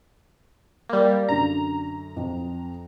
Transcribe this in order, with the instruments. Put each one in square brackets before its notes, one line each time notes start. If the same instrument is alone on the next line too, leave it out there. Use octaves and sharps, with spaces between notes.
[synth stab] G3 A#3
[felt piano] F#2 D3 [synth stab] A#5
[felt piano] F2